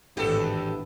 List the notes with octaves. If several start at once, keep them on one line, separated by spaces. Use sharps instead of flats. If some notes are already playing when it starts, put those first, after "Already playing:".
G#1 E2 A2 B3 D4 E4 G4 A4